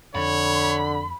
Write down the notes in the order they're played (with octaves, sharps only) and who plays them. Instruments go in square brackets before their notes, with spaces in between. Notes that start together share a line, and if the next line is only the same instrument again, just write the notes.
[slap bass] F2 [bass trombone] D3 [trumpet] C#5 [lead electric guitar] B5